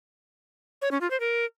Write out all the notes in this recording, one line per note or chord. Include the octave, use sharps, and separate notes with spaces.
C#5
C#4
F4
C5
A#4